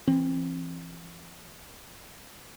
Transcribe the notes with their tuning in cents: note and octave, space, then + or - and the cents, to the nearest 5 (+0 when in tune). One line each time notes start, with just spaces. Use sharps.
E3 +40 C4 +25